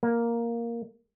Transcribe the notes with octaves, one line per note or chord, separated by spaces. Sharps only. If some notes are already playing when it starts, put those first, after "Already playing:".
A#3